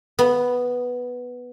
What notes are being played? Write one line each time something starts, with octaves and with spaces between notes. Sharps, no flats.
B3